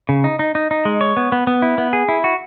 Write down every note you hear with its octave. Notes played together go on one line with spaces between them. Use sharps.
C#3
D#4
D#4
D#4
D#4
G#3
C#5
B3
B3
B3
E4
B3
G#4
E4
F#4